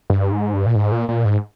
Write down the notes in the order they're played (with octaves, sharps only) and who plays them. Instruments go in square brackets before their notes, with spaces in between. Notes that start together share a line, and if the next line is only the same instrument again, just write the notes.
[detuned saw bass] G2
G#2
G2
A#2
G#2
A#2
A#2
G#2